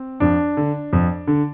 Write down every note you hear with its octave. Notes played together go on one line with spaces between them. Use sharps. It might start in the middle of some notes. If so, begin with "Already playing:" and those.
Already playing: C4
F2 D4
D3
F2
D3